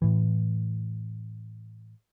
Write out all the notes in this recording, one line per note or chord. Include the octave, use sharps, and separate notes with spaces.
A2 E3